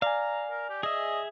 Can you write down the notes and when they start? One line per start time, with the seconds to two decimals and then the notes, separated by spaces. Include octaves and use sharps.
0.02 D5 F5 G#5 A#5
0.50 A#4
0.70 G4
0.83 G#4 D#5 E5